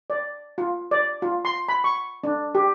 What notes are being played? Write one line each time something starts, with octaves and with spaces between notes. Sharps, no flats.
D5
F4
D5
F4
C6
B5
C#6
D4
G4